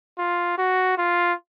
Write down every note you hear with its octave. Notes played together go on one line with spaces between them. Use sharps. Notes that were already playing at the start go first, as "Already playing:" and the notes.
F4
F#4
F4